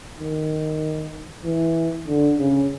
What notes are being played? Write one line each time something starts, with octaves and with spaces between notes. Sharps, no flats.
D#3
E3
D3
C#3